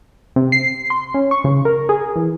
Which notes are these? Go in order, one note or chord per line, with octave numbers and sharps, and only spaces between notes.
C3
C7
C6
C#4
C#6
C#3
A#4
G#4
E3